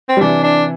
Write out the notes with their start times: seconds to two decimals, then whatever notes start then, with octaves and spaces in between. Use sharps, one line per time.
0.09 C4
0.17 G3
0.21 C3 E3 D4
0.44 D4